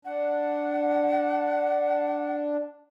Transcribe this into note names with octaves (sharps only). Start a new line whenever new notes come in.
D4 F#5